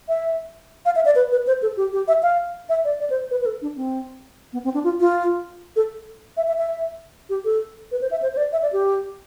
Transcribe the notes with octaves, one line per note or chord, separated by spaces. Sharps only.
E5
F5
E5
D5
B4
B4
C5
A4
G4
G4
E5
F5
E5
D5
D5
C5
B4
B4
A4
D4
C4
B3
C4
D4
F4
F4
A4
E5
E5
E5
G4
A4
B4
C5
E5
C5
C5
D5
E5
D5
G4